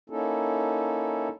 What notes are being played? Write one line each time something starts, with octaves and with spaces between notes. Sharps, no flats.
A#3 C#4 D#4 E4 A4